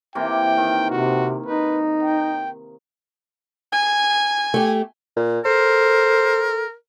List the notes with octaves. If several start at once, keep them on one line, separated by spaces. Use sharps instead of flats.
C3 E3 A#3 G5
D#3
C3 F#4
D#4 B4
G5
G#5
A3 G4
A#2
A4 A#4 C5